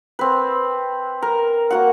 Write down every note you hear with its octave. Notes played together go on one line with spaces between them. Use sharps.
C4 B4
A#4
A#3 F#4 F#5